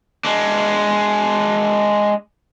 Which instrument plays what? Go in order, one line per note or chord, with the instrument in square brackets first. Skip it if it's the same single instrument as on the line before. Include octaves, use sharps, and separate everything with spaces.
[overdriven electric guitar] G#3 D4